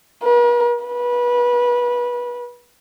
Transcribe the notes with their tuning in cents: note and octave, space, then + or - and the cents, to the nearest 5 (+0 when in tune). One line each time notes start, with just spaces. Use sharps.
B4 -45
B4 -25